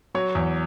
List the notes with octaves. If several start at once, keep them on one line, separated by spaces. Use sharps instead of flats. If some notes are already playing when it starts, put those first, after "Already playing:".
F#3 C#5
E2